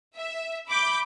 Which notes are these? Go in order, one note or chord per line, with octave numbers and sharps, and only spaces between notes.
E5
B5 D6 G6